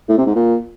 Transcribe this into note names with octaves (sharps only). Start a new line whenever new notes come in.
A2
C3
G#2
A#2